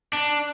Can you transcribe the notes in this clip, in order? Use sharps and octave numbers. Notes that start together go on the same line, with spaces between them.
D4